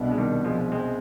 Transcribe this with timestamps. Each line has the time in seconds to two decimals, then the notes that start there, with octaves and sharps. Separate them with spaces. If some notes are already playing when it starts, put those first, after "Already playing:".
Already playing: C2 B2 B3 D4
0.11 G#3
0.18 D#3 G3
0.44 F3 G#3
0.72 G#3 C4